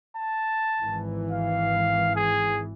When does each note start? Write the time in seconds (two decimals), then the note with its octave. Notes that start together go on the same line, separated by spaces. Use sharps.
0.17 A5
0.81 G#1 E3
1.31 F5
2.16 G#4